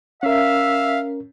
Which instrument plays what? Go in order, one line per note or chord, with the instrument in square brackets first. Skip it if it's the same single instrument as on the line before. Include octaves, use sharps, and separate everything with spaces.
[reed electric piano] C#4 A#4 [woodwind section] E5 [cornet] F5